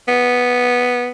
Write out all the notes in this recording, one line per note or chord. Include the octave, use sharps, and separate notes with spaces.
B3